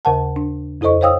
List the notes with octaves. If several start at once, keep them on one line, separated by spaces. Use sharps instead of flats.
D#2 C#3 A#4 F#5 A5
D4
F2 E4 A4 C5 D#5 C#6
C5 C#5 F5 G5 D#6 E6